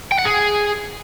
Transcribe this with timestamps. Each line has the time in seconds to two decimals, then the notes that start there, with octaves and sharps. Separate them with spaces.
0.12 G5
0.19 F#5
0.25 G#4